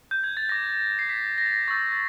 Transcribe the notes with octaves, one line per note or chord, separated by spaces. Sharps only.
G6
G#6
A6
D6 G6 A#6
C7
B6
A#6
A6
A#6
C#6 E6 G6 A6
A6